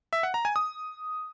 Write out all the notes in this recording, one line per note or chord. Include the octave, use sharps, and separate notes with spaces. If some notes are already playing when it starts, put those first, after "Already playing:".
E5
F#5
A#5
G#5
D#6